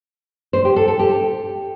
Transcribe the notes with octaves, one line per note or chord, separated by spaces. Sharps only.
C5
G4
A4
A4
G4